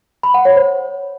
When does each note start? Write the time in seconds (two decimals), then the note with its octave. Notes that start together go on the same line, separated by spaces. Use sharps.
0.23 B5
0.34 F#5
0.45 C#5
0.56 C5